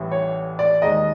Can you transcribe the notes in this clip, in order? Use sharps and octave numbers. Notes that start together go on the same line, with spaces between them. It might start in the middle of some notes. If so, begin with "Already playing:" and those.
Already playing: A1 A2 E3 G3
C#5
D5
D#2 D#3 G#3 D#5